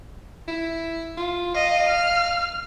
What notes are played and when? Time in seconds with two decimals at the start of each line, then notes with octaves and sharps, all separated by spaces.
0.48 E4
1.17 F4
1.55 D#5 F5
1.89 F6